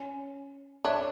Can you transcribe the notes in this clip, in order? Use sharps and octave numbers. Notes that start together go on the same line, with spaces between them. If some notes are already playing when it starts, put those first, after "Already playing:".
Already playing: C#4
D4 C#5 E5